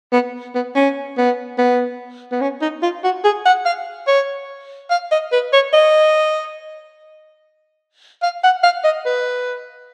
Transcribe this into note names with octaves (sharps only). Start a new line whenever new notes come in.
B3
B3
C#4
B3
B3
B3
C#4
D#4
F4
F#4
G#4
F#5
F5
C#5
F5
D#5
B4
C#5
D#5
F5
F#5
F5
D#5
B4